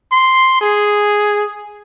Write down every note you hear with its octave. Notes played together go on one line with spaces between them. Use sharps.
C6
G#4